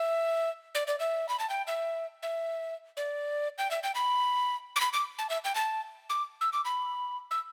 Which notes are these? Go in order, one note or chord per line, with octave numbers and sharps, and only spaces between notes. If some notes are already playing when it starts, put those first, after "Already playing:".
Already playing: E5
D5
D5
E5
B5
A5
G5
E5
E5
D5
G5
E5
G5
B5
D6
B5
D6
A5
E5
G5
A5
D6
E6
D6
B5
E6